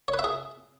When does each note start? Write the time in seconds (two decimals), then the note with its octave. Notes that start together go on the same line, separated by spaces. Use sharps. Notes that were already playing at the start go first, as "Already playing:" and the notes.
0.08 C#5
0.14 B4
0.19 E5
0.24 G#4